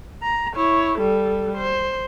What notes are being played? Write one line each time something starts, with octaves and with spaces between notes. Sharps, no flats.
A#5
E4 C#5
G3 A4
C5